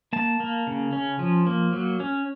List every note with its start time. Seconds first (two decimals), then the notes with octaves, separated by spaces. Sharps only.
0.13 A#3 A5
0.40 A#3
0.67 C#3
0.93 C#4
1.19 F3
1.47 A#3
1.73 F#3
2.00 C#4